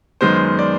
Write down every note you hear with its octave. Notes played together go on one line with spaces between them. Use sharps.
F#2 D#3 G#3 B3 C5
D5